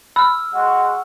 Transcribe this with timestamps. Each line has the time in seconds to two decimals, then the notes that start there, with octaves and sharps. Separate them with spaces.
0.16 B5 E6 F6
0.54 G#3 F#4 F#5